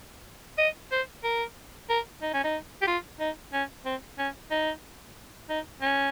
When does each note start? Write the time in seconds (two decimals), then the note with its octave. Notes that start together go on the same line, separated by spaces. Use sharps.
0.59 D#5
0.92 C5
1.24 A#4
1.90 A#4
2.22 D#4
2.34 C#4
2.44 D#4
2.82 G4
2.87 F4
3.20 D#4
3.53 C#4
3.86 C4
4.19 C#4
4.51 D#4
5.50 D#4
5.82 C#4